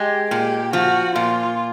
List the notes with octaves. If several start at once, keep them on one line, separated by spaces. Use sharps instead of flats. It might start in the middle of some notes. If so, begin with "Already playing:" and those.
Already playing: G#3 G4
A#2 G4
F3 F#4
A#2 F4